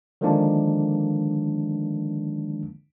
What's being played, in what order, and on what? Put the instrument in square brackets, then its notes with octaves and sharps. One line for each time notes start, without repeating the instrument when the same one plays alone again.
[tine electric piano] D3 D#3 F3 G#3 A#3 D4